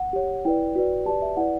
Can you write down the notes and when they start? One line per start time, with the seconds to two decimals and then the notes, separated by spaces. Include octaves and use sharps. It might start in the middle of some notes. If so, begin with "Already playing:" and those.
Already playing: F#5
0.13 G4 C#5
0.45 E4 B4 D5 G5
0.76 F#4 B4 D5
1.06 G4 B4 D5 A5
1.22 E5
1.37 E4 B4 D5 F#5